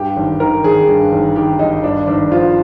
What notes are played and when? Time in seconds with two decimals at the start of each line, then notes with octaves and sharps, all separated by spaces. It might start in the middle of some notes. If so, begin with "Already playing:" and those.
Already playing: G2 G4
0.17 G#1
0.40 D#3 A#4
0.64 G#1 G#4
0.88 G2
1.12 G#1
1.35 D#3 G4
1.59 G#1 D#4
1.83 G2 D4
2.07 G#1 D4
2.31 F3 F4